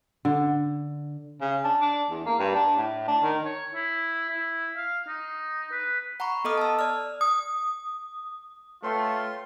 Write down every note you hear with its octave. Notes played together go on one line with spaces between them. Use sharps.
D3
C#3
D4
D4
E2
A#3
G2
D4
A2
D4
D#3
C#5
E4
E4
F5
D#4
B4
F#5 A#5 B5 C#6
B3 A4 D#5 D6 D#6 F6
A5 E6
D5 F6
D#6
A3 F4 B4 C#5 G5 C6